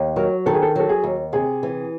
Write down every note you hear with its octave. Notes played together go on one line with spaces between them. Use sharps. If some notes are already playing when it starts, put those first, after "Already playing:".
Already playing: D#2
F#3 A#4
D#3 A4
G#4
A4
F#3 A4
G#4
D#2
C3 G#4
E3